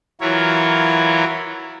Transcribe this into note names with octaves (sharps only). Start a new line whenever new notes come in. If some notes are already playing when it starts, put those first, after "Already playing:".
E3 F#3 E4 F4 A#4 C#5